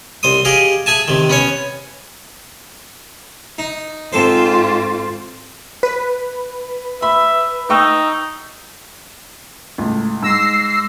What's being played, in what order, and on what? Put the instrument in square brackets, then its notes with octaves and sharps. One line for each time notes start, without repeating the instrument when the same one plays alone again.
[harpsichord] C2 C5 D#6
G4 G#4 D#5 F5
G#4 E5 G#5 A5
C3 D#3
B3 C#4 C#5
D#4
[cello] G#2 F4 [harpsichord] C4 A4 C5
[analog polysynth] B4
[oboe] E5 [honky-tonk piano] B5
[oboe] D#4 [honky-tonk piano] G5 C#6 E6
[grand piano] C#2 A2
[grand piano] G#2 [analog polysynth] E6 A#6 C7